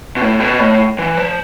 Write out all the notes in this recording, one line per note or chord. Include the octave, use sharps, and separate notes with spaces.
B2
A2
B2
A2
E3
F3